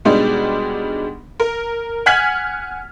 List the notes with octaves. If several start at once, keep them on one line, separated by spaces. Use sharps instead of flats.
B2 G3 G#3 D4 D#4
A#4
F#5 G#5 F6 G#6 B6 F#7